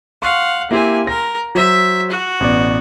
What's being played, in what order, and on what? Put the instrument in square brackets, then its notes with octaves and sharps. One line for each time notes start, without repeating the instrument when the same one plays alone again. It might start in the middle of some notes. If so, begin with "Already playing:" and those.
[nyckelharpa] F5 F#5 [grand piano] C6 C#6
[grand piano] A#3 E4 G4 [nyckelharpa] C4 G#5
[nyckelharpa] A#4 [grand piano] A#6
[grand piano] F#3 C5 [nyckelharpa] E5
[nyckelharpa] F#4
[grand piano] A1 B2 D5